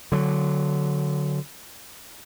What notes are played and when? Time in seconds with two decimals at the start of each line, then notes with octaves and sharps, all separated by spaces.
0.12 D3 F#3